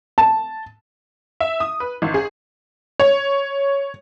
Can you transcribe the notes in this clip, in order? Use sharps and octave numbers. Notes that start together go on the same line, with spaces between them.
A5
E5
D#6
B4
G#1
G#4
C#5